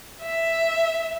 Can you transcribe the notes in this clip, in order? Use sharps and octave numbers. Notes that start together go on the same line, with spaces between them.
E5